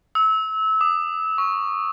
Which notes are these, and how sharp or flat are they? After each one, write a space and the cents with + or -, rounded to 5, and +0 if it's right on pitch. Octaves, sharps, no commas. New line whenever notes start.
E6 -25
D#6 -45
C#6 +0